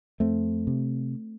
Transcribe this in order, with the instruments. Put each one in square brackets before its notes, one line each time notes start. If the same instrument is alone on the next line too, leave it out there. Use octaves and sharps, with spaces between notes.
[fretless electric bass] F2 A3 C4
C3